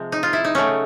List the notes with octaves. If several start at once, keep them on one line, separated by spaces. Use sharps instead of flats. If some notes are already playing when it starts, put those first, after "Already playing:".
Already playing: C3 F3 G#3
D#4
F4
E4
D#4
C#3 F#3 A3 C#4